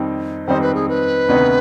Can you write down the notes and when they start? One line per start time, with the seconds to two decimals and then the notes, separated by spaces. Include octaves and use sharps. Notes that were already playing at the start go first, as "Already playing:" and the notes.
Already playing: F2 D#3 G3 C4 D#4
0.46 F2 D#3 G3 C4 D#4 C5
0.62 B4
0.75 G#4
0.89 B4
1.28 D2 C3 D#3 B3 D#4